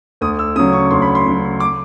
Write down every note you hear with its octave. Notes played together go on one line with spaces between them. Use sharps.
D2 D#6
E6
C#3 F#3 D#6
C#6
D2 C6
B5
C6
C#3 F#3
D6